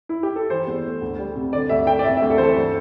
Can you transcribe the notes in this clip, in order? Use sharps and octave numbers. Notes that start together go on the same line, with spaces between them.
E4
G4
A4
E3 C5
E2
A3
D2
G3
C3
D3 D5
D2 E5
A3 G5
D5
C3 E5
E5
D2
A4
E3 C5
A4
G2